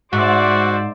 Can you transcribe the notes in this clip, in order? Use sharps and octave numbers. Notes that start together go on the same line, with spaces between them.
G#2 F#4 C5 D5 E5